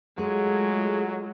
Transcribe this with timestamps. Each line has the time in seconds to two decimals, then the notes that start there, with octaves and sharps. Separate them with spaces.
0.18 F#3 G#3 A3 F4 G#4 C#5